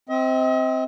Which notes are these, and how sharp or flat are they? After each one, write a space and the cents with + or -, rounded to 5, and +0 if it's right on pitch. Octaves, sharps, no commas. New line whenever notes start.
C4 +0 D#5 +40